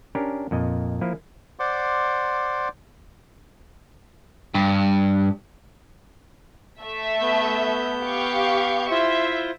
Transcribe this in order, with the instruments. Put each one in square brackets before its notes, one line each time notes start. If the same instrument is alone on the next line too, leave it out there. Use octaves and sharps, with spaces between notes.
[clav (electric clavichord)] C#4 D4 G4 A#4
F2 A#2 D#5
F3 A#3 E4
[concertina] C5 D5 F#5 C6 D6
[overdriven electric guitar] G2
[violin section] A3 E5
[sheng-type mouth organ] B3 G6
[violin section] G4 F5 C#6
[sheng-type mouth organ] E4 F4 C5 [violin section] E5